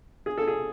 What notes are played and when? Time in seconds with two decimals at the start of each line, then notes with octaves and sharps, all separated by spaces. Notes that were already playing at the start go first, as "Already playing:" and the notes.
0.26 G#4
0.38 A4
0.48 G#4